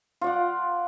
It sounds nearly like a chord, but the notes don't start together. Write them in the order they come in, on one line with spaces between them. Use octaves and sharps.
F4 D5 F#5